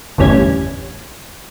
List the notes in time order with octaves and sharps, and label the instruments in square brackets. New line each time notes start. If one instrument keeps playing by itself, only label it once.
[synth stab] G1 E2 A2 G3 C#4 G#6